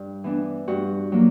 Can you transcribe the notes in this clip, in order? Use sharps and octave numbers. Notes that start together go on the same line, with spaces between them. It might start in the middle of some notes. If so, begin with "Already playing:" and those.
Already playing: G2 D4
E3 B3 D4
G2 F#4
F#3 A#3